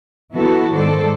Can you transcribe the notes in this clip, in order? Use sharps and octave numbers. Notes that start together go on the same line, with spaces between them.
E3 B3 E4 F#4 A4
G#2 D#3 A4 C5 D5